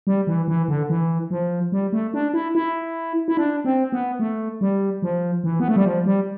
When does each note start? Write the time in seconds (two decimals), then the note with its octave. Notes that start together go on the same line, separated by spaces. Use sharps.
0.07 G3
0.27 E3
0.48 E3
0.69 D3
0.89 E3
1.31 F3
1.72 G3
1.93 A3
2.14 D4
2.34 E4
2.55 E4
3.28 E4
3.37 D4
3.65 C4
3.92 B3
4.19 A3
4.61 G3
5.02 F3
5.44 E3
5.60 B3
5.68 A3
5.76 G3
5.85 F3
6.06 G3